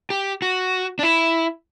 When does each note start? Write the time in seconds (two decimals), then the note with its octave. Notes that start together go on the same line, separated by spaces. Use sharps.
0.10 G4
0.42 F#4
0.99 D4
1.03 E4